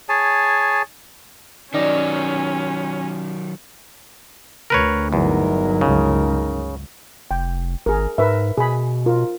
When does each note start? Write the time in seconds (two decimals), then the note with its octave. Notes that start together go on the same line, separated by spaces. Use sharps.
0.09 G#4 C#5 G#5 A5
1.74 D#3 F#3 G3 C#4 D#4 D5
4.70 D2 A#4 B4 C#5
5.13 G1 E2 F#3 D#4 A#4
5.81 C#2 C#3
7.31 F1 G5
7.86 G#1 G#4 A#4
8.18 G#2 A#4 B4 E5
8.57 B2 G#4 B5
9.06 F4 A#4